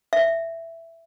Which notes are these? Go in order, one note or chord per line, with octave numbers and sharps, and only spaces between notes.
E5